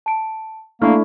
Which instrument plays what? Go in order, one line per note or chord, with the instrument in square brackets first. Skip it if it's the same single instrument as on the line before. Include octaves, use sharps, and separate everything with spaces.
[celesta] A5 D7
[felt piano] A3 [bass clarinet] A#3 [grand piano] D4 E4 [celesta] C#6 F6